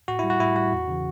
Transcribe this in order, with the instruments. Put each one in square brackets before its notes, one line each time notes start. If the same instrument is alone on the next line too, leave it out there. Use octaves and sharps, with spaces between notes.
[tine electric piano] A2 F#4
G3 E4
F#4
A2 E4
G3 F#4
E2
C#3 E3